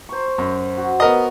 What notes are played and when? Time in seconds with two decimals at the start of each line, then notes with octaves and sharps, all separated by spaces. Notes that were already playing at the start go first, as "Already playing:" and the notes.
0.09 C5 C#6
0.38 F#2
0.77 F#4
1.00 B3 A#4 D#5